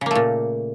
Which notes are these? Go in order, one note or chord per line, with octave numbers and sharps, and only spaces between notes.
A#2 C#3 A3 A#3